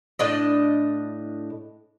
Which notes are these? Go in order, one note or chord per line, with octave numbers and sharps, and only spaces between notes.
A2 D4 D#5